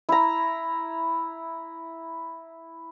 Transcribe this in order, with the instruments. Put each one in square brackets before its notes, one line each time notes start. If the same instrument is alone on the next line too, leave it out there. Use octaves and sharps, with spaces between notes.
[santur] E4 A#5